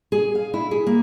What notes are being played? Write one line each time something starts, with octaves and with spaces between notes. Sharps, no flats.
G#4
F5
E4
G#4
A#3